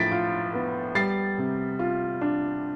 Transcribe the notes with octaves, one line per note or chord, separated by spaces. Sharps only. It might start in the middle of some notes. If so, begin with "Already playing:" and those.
Already playing: A2 F3 A6 B6 D7
F4
B3
G3 A6 C7
C3
F4
D4